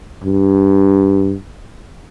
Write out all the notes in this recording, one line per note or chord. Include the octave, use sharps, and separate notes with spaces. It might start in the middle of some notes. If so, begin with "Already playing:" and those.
G2